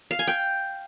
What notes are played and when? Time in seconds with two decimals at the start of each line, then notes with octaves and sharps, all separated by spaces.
0.11 F5
0.19 G#5
0.28 G5